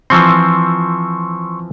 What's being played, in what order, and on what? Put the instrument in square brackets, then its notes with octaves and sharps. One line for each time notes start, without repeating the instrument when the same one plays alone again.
[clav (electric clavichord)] E3 F3 C4 [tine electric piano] C6 C#6 E6